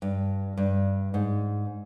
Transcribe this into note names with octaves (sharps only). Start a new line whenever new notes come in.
G2
G2
G#2